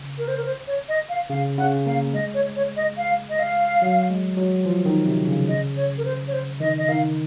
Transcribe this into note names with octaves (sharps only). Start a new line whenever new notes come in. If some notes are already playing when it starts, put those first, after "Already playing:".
Already playing: C#3
A#4
C5
A#4
C5
C#5
D#5
F5
C#3 F5
C#3 F#5
A#3 F5
G#3 D#5
C#5
C#5
D#5
F5
D#5
F5
F#3
G#3
F#3
F3
D#3
C3
C#3
D#5
C#5
A#4
C5
C#5
C5
D#3 D#5
D#5
D#3 F5